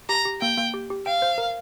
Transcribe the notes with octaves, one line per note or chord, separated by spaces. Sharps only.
G4 A#5
G4
A#3 G5
A#3
G4
G4
F5 G5
C5
A#4